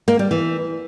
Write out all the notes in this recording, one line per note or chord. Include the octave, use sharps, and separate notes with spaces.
A#3
G3
E3